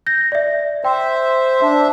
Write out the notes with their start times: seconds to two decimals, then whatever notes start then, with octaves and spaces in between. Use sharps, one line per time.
0.07 G6 A#6
0.32 D5 E5
0.84 C5 E5 G5
1.62 D4 E5